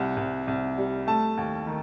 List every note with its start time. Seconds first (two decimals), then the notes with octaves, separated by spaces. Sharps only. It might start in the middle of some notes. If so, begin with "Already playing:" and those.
Already playing: C2 G3 F#5
0.17 C2
0.48 C2
0.78 G3
1.07 A3 A5
1.37 D#2
1.67 D#3